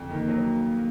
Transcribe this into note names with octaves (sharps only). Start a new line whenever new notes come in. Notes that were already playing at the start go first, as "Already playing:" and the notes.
Already playing: F2
D#3 A#3
F#3